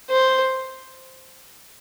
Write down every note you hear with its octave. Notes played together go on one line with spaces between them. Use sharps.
C5